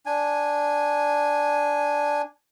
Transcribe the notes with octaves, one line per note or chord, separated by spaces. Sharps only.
D4 G#5